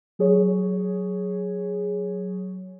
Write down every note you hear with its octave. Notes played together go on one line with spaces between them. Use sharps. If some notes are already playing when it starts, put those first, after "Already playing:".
F#3 G#4 C#5